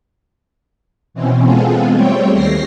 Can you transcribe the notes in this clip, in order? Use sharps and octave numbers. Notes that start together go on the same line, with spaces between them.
B2 E3 C4 C#4
G#3 B3 C4 F4 G#4 A4
G3 A3 C4 C#5 G5
D#2 A#6 C7